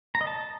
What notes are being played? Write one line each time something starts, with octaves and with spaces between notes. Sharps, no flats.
A#5
D#5
A5